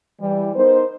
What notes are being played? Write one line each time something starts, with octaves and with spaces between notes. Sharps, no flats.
E3 G3
B3 D#4 A#4 C5